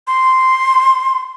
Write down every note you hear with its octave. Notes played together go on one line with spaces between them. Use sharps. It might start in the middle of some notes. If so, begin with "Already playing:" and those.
C6